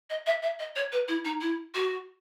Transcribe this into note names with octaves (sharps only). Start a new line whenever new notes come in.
D#5
E5
E5
D#5
C#5
B4
E4
D#4
E4
F#4